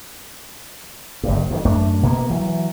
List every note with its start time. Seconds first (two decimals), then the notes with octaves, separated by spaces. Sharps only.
1.23 F#1 G2
1.51 F2 D3 D#3
1.65 F#2 A3 D4
2.03 B2 A#3 B3
2.30 E3 F#3